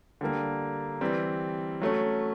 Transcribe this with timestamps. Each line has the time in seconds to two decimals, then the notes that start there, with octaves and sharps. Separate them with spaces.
0.21 D3 G3 A#3
1.01 E3 G3 C4
1.81 F#3 A3 C#4